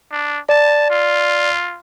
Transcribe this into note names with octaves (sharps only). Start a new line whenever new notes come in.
D4
D5 A5
F4